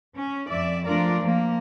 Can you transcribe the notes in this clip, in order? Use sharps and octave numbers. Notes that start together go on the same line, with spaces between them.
C#4
F2 D5 E5
F3 A3 D4 F4 A#4 D5
F3 A#3